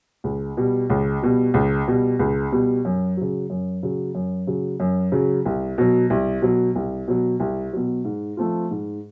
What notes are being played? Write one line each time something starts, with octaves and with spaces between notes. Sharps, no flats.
C#2
B2 G3
C#2
B2 G3
C#2
B2 G3
C#2
B2 G3
F#2
C#3 F#3
F#2
C#3 F#3
F#2
C#3 F#3
F#2
C#3 F#3
C2
B2 F#3
C2
B2 F#3
C2
B2 F#3
C2
B2 F#3
G#2
F3 A3 C4 F4
G#2